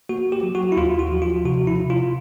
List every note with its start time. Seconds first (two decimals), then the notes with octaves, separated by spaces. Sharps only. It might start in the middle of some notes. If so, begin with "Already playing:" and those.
0.09 A#3 F#4
0.32 G4
0.43 F#3
0.55 F#4
0.72 E4
0.77 D#2 F4
0.99 F#4
1.11 F3
1.22 F4
1.45 C3 F#4
1.67 E4
1.79 C3
1.90 F4